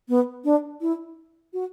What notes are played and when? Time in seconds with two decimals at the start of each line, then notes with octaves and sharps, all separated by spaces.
0.09 B3
0.44 D4
0.81 E4
1.53 F#4